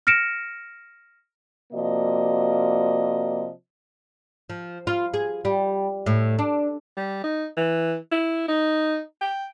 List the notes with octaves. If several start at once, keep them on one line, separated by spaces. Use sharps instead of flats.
F6 A#6 C#7 D7 E7
C3 F3 A#3 F#4 D5 D#5
F3
F4
G#4
G3
A2
D4
G3
D#4
E3
E4
D#4
G5